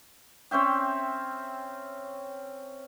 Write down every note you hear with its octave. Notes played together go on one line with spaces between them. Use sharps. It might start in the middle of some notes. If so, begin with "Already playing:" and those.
C4 C#4 E5 G5